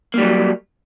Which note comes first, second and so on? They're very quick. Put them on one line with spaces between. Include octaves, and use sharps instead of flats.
A#3 G3 F#3